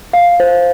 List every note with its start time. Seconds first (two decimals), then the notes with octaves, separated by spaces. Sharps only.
0.13 F5
0.40 C5